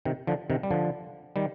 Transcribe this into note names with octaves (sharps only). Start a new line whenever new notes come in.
C3 D#3
D3 F3
C3 D#3
G3
D3 F3
D#3 G3